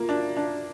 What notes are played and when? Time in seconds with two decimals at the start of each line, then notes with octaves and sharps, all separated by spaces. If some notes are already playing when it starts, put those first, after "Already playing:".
Already playing: A#3 F4
0.09 D4
0.37 D4